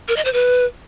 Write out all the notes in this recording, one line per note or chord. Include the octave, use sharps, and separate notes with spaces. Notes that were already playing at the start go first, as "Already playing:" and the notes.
A#4
D#5
C5
B4